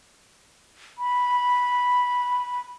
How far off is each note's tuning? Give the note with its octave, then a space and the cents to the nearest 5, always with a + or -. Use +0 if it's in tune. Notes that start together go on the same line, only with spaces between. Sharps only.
B5 -10